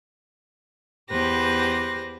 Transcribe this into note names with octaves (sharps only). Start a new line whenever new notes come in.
E2 G4 B4 C5 A#6